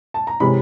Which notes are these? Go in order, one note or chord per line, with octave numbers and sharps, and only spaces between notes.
A5
A#5
C3 E3 G#3 C#4 B5